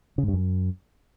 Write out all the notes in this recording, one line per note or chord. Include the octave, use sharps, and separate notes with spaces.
C#3
G#2
G2
F#2